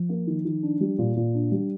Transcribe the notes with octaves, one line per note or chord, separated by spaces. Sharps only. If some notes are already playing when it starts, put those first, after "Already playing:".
Already playing: F3
A#3
D#3
D#3
D4
G3
A#2
A#2
D4
G3